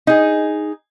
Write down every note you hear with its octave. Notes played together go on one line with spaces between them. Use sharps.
D#4 G#4